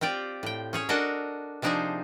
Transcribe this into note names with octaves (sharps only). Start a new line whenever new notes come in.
C4 F4 G4 D5
A2 G5
C#4 G#4 C#5
D4 F#4 A4 A#4 D#5 A5
C3 F3 D4 D#4 G#4 C5